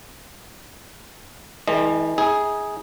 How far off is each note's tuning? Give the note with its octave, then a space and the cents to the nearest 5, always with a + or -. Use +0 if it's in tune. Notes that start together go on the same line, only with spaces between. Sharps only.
E3 -35 G#3 +30 D#5 -30
D#4 +45 G#4 +0